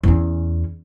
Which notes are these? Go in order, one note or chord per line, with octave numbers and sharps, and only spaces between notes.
E2 C#4